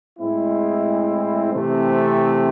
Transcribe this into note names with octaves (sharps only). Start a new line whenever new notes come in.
A2 G#3 C4 E4
C3 E3 A3 C4